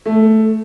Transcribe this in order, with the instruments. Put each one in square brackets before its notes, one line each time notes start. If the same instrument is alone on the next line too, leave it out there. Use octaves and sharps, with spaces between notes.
[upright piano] A3